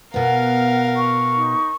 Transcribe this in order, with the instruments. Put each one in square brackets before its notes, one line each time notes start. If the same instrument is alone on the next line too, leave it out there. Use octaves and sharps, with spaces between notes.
[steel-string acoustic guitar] B2 B3 [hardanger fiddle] A#4 F5 [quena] F#5
[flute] C#6
[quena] D#4